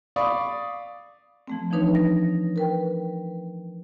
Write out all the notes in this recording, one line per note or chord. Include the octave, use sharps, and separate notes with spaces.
D5 F5 B5 C#6 D#6
F3 A3 C4
E3 F3 D4 D#4 B4 C#5
A#6
A#4 B4 G5